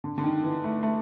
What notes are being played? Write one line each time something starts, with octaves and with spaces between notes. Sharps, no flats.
D3
D3
D#3
E3
A3
A3